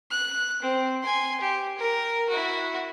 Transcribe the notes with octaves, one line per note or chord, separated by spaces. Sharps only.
F#6
C4
G#5 C6
G4
A#4
E4 F#4